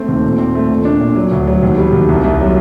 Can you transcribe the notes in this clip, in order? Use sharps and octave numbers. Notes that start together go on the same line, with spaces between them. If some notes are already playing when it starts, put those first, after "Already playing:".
Already playing: A3 C4
D#2
A#2
C4
A3
A#2
D4
A#2
F#3
D2
F#3
D#2
G3
D#2
C2
C2
F#3